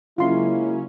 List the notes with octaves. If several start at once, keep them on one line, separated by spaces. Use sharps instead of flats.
C#3 F#3 G#3 A#3 C#4 E4 F4 C6